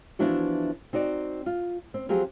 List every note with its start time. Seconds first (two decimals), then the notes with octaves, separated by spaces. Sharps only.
0.19 E3 F3 B3 D4 E4 F#4
0.93 C4 D#4 F#4 D5
1.46 F4
1.94 C4
2.09 F3 F#3 C4 G4 G#4